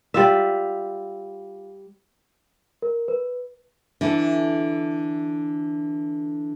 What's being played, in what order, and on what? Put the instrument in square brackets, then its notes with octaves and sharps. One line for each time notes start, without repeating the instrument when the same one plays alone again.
[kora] G3 F4 E5
[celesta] A#4
B4
[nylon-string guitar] D3 E3 E4 A4